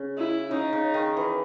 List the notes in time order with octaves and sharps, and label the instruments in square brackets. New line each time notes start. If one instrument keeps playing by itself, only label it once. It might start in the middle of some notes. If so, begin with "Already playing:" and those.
Already playing: [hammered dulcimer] C#3
[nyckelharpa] E4
[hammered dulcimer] C#3 [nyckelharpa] D#4
[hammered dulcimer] C#3
D#3
E3